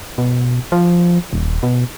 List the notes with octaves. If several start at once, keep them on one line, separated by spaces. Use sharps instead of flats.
B2
F3
D#1
B2